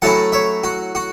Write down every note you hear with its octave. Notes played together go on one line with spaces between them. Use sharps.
A2 F#3 A3 C#4 E4 F#5 A5
C#5 E5
F#4
F#4